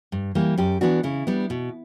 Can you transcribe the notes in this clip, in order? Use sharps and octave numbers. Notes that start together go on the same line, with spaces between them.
G2
E3 G3 A#3
F#2 G4
E3 B3 D4 F#4
C#3 E4
G3 B3 D4
B2